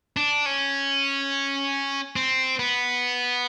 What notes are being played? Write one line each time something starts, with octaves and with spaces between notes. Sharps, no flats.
D4
C#4
C4
B3